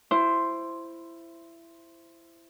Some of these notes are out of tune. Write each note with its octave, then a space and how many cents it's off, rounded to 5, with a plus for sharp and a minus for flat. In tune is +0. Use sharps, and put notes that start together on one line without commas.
E4 +20 C5 +0